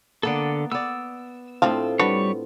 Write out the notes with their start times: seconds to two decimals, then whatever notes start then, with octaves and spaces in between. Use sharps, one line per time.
0.23 D3 A#3 B3 A4 D5
0.72 B3 D5 E6
1.62 A2 F3 C4 D4 F4 F5
1.99 G3 D4 F#4 B4 C#5